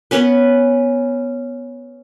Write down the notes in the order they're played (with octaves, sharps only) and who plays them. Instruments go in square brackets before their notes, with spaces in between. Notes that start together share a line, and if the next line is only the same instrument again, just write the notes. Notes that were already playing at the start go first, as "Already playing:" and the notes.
[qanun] B3 C#4 B4